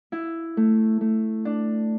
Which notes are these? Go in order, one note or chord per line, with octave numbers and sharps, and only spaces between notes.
E4
A3
A3
D4